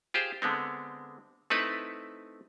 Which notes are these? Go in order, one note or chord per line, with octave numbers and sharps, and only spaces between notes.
F4 G4 G#4 C5
D3 G#3 B3 C4
A3 C4 D#4 E4 B4